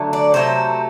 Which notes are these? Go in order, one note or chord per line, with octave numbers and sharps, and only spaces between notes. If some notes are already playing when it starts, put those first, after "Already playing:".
Already playing: D3 F#3 A3
D5
C3 F#3 A3 C5